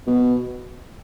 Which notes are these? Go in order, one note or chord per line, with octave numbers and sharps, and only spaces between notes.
B2